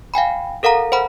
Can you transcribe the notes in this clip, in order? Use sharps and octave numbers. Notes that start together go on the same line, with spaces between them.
F5 G5 G#5 B5
A4 A#4 F5 F#5 A#5
C5 F#5 B5